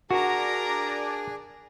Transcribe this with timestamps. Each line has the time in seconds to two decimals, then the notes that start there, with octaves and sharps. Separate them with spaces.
0.11 D4 F#4 G#4 A#4 D5 A#5